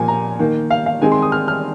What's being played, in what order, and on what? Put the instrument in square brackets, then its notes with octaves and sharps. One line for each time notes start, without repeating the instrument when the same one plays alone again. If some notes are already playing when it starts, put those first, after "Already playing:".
Already playing: [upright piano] A#2 F3 A#3 G#5
A#5
D#3 A#3
F5
F5
D#3 G#3 C4 G#5
C6
D#6
F6
F6